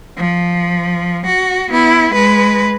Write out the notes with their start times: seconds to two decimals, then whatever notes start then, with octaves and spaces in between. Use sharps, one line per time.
0.17 F3
1.26 F#4
1.69 B3 E4
2.12 G#3 B4